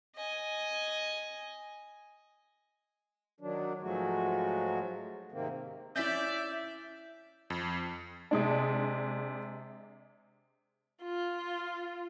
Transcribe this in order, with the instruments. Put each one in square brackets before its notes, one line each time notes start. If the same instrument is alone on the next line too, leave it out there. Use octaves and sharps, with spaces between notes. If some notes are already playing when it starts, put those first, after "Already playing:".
[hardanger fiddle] D#5 G#5
[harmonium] D#3 F#3 D4
G#2 F3 F#3 G#3 A3 F#4
G#2 C3 D#3 A#3 C4
[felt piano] C#4 E4 [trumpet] D5 [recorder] E5 [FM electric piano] G6 B6
[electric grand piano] F2
[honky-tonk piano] C3 G#3 D4
[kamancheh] F4